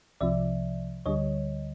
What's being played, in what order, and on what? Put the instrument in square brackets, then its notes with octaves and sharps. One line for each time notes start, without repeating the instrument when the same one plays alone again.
[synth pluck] C2 C3 F3 D5 E5
D2 D3 G3 C#5 D#5